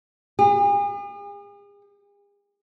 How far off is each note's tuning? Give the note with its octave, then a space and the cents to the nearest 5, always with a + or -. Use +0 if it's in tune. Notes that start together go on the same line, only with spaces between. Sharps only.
G#4 -45